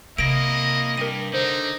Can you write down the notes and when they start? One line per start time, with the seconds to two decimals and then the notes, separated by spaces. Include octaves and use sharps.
0.18 C3 A#3 E4 D#5 A#6 D7
0.97 G2 G3 A#4 D#7
1.34 D3 D#4 C5